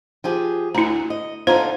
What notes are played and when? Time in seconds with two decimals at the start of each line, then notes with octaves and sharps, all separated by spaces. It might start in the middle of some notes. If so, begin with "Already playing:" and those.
0.24 F3 G4 G#4
0.75 D2 E4 A#5
1.10 D#5
1.47 D3 D#4 F4 C5